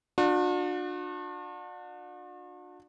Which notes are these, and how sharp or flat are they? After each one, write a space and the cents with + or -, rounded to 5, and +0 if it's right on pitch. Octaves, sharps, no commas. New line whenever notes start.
D4 +25 F#4 -45